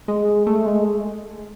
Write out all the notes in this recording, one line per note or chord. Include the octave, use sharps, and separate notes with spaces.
G#3
A3
G#3